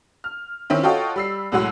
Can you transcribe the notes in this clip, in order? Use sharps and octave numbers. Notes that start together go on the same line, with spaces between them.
F6
D#3 C4 C#4 E4
F4 F#4 A4 C#5 D#5 G5
G3 E6 C7
C2 A2 F#3 G#3 F#5 E6